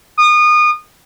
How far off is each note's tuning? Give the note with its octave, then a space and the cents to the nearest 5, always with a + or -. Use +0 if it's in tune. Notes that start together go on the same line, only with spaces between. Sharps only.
D#6 -30